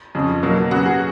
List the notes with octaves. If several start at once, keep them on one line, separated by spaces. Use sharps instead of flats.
F2 C#3 F3
B2 F#3 A#3
C#3 F#3 B3 F#4
G#4